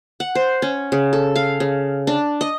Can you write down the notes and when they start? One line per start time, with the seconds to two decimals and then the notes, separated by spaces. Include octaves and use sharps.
0.20 F#5
0.35 C5
0.62 C#4
0.92 C#3
1.13 A4
1.36 F5
1.60 C#3
2.07 D4
2.41 D#5